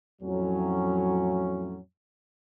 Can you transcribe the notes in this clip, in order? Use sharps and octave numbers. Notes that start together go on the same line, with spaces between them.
F2 A2 F#3 C#4